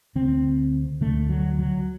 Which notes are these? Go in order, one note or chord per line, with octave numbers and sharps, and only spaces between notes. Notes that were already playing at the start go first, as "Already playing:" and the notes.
D2 D3 C4
D2 D3 A3
F#3
F#3